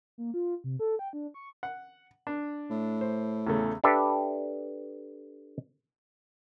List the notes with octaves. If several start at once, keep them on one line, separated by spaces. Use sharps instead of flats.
A#3
F4
C3
A4
G5
D4
C#6
F#5
D4
A2
C5
E2 C#3 A3
D4 G4 A4 B4 E5